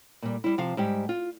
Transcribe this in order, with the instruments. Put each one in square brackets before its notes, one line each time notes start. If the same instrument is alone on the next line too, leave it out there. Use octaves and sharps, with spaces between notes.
[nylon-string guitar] A#2 G3
G3 E4
C3 F3 F5
G#2 G3 G4
F4